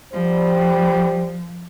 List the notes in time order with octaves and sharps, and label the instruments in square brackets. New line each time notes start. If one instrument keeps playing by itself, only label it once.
[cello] F3 [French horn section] G3 C5